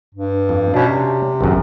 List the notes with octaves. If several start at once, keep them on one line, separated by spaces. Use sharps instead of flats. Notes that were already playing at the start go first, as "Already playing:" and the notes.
G2
F2
B2 C#4 D4
C3
G#1 F#2